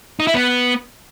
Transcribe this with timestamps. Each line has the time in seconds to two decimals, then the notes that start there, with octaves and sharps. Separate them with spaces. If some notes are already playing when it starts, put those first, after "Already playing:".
0.20 D#4
0.27 E4
0.35 B3